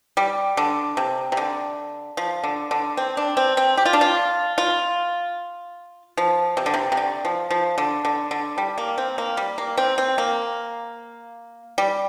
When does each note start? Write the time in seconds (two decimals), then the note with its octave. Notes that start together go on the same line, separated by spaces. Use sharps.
0.17 G3
0.57 D3
0.97 C3
1.32 C3
1.37 D3
2.17 F3
2.43 D3
2.71 D3
2.97 C4
3.17 D4
3.37 C4
3.57 C4
3.77 G4
3.86 F4
3.93 D4
4.01 F4
4.58 F4
6.17 F3
6.57 C3
6.66 D3
6.74 C3
6.92 C3
6.97 D3
7.25 F3
7.51 F3
7.78 D3
8.05 D3
8.31 D3
8.58 G3
8.78 A#3
8.98 C4
9.18 A#3
9.37 G3
9.58 A#3
9.77 C4
9.98 C4
10.18 A#3
11.78 G3